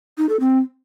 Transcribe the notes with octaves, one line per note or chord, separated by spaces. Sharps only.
D#4
A4
C4